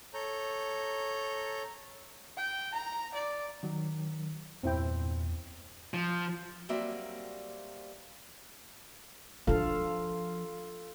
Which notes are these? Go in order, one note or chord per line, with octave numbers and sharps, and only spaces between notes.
A4 C#5 A#5 G6
G5
A#5
D5
D#3 F#3
E2 G2 A#2 C4 E4 G5
F3
F#3 G3 A#3 C4 D5 E5
F3 D4 F4 A4 F5